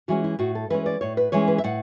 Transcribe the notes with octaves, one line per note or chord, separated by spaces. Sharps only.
E3 G#3 C#4 F#4
E4
A2 F#4
A4
E3 G#3 C#4 B4
D5
A2 C#5
B4
E3 G#3 C#4 C#5
B4
E5
A2 F#5